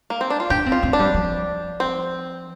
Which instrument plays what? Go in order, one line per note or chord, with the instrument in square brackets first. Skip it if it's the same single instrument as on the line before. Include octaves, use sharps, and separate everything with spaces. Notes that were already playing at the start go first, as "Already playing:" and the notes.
[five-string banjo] A#3
C4
D4
F4
[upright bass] D4 [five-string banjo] G4
[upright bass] C4
[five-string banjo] F4
[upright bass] C4
[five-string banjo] D4
[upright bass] G3
F3
[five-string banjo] C4